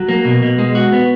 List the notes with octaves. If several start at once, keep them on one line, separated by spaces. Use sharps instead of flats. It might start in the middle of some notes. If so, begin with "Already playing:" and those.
Already playing: F#3
A#3
B2
B2
G#3
F#4
B3